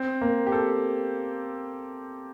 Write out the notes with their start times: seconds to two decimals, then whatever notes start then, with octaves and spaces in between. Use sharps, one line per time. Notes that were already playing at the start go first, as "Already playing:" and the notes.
Already playing: C4
0.21 A#3
0.47 G4
0.52 A4